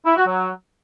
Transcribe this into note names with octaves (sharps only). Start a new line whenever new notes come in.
E4
F#4
F#3